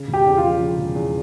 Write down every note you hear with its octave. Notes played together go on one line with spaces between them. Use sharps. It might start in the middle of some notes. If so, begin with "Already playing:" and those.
Already playing: C#3
E1
G4
E2
F4
F3
C#3
E1
E2